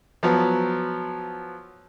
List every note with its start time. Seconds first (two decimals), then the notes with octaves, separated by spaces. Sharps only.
0.23 F3 F#3 B3